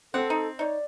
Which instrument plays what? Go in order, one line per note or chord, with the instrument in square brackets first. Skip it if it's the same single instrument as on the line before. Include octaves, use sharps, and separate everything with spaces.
[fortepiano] C4 [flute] A4 [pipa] F#5
[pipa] D#4
[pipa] D#4 C#5 [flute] D5